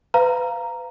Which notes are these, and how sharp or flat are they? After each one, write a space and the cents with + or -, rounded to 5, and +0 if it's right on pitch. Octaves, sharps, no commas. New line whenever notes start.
B4 +25 F5 -10 A#5 +0